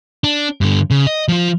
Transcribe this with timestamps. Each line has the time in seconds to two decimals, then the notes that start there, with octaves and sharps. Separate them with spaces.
0.24 D4
0.61 G2 D3
0.91 C#3
1.07 D#5
1.28 F3 F4